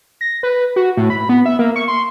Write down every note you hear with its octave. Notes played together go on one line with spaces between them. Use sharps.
A#6
B4
F#4
A2
B5
B3
E5
A#3
C#6
C6